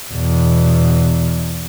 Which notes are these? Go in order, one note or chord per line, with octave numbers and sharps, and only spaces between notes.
E2 B2